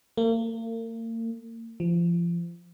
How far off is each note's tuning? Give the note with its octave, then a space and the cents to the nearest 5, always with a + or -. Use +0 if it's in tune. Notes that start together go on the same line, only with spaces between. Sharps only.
A#3 -40
F3 -30